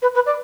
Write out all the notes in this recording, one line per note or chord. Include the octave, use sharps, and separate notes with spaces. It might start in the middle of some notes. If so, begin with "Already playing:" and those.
B4
B4
D5